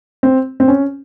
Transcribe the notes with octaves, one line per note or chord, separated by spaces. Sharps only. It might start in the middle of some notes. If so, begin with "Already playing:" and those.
C4
C4
C#4